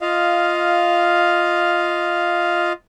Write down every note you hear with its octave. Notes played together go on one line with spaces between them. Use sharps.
F4 D#5 F5